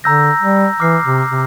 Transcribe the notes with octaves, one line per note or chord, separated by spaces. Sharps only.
D3 A#5 E6 G6 A#6
G3
E3 D6 F6 C7
C3
C3